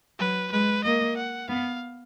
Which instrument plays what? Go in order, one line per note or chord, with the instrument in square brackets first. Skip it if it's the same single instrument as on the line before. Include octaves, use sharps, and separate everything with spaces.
[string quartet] F#3 [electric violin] B4
[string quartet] G#3 [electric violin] B4
[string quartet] A#3 [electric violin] D#5
[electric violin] F#5
[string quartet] B3 [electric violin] F5